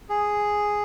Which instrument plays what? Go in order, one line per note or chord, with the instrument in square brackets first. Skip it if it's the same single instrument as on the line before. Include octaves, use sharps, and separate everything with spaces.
[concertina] G#4